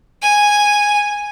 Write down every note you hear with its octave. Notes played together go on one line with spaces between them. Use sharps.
G#5